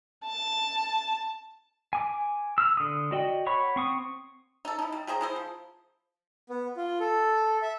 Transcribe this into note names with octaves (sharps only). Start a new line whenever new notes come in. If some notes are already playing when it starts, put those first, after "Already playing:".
A5
G#5 D6
E6 F6
D3 D#6
F#4 D5 D#5 G5
C#5 F#5 B5 C#6
C4 C#6 D#6
D#4 A4
D#4 E4
G3
G4 G#4 C5 A#5
G#3 E4 C5
F3
B3
F4
A4
E5